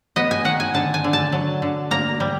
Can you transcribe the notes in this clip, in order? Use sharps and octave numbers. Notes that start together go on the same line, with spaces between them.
B3 D#5
G#5
D#3 F#5
G#5
D3 A5
G#5
D3
A5
F#3
D3
A#3 A#5
G3